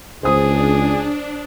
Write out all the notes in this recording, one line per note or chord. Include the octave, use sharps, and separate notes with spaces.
C#2 D4 G#4 C5 D#6